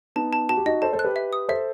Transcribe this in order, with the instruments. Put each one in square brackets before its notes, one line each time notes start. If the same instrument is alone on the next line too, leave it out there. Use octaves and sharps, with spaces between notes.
[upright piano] B3 D#4 [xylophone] A5
[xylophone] A5
[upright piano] F#4 [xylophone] A5
[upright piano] G4
[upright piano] D#4 F#4 [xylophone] D#5
[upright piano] A4 C5 [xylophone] A5
[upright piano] A4 C5
[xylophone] F#6
[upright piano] G4 B4
[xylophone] E5
D#6
[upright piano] A4 C5 [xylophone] E5